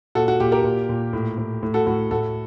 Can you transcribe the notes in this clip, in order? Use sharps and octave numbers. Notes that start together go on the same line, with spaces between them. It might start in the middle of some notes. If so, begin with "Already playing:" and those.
A#2 F#4 A4
F#4
A#2 G4
G4 A#4
A#2
A#2
A2
A2
A2
F#4 A4
A2 F#4
A2 F#4 A4